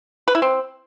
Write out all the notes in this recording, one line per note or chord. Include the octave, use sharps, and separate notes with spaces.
B4
E4
C4